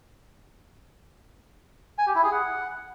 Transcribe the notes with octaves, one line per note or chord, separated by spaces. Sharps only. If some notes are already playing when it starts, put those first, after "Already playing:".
G#5
G4
E4
G#4
F#5